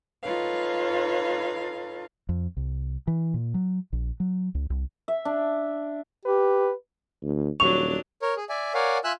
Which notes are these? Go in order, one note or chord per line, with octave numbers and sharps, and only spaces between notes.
D#4 F4 A4 B4 C#5 F5
F2
C2
E3
A#2
F#3
A#1
F#3
C#2
C2
E5
D4
G4 B4
D2
D#1 F#3 D4 C#6 F7
A#4 C#5
G#4
D5 E5 G#5
A#4 C#5 D5 F5 F#5 G#5
F4 E5 G#5 E6 F#6